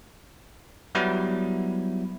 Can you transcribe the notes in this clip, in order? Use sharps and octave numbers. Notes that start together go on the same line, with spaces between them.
F#3 G3 B3 E4